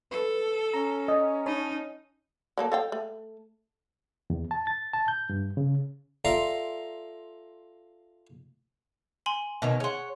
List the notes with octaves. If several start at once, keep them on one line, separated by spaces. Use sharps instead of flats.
A4 B4
C#4 A#5
D#5
D#4 C#5 A5 B5
F#3 A#3 A4
A4 F5 G5
A3
E2
A5
A6
A5
G6
G2
C#3
F4 A4 D5 E5 A#5 C6
G#5 C6 F#7
B2 D#3 C#4
G#4 C#5 F#5 C6